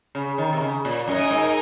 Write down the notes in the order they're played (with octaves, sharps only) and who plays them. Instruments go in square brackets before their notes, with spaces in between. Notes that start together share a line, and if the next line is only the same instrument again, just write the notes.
[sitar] C#3
D#3
C3
C#3
A#2
[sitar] F#2 [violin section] D#4 A#4 D#5 G#5
[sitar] G#2